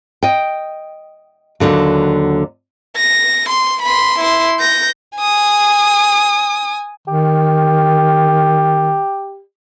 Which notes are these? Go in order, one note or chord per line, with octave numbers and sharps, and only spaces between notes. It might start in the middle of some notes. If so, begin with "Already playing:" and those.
D#5 G5
D#2 B2 D3 F#3
A#6
C6
B5 C6
E4 C6
G6 A#6
G#5 D#6
D#3 G4